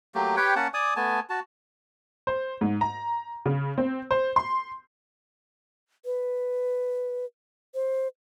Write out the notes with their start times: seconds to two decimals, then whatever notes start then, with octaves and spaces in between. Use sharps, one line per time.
0.15 F#3 A3 A#3 G4
0.37 G4 B4 C#5 G5
0.56 A#3 C#4 F#5 A5
0.74 D5 G#5 D6 D#6
0.96 A3 B3 G#5 A5
1.30 F#4 A5
2.27 C5
2.61 G#2
2.81 A#5
3.46 C#3
3.78 C4
4.11 C5
4.36 C6
6.05 B4
7.75 C5